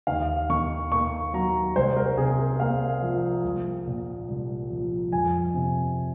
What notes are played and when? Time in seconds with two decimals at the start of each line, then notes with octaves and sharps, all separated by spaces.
0.07 D#2 F5
0.50 D#3 C#6
0.92 A#3 C#6
1.33 F#3 A#5
1.76 C2 C5
1.97 A#4
2.18 C3 G#4
2.40 A#4
2.60 A#3 F5
3.02 F3
3.44 C2
3.87 A#2
4.28 C2
4.70 F3
5.12 F2 G#5
5.54 C3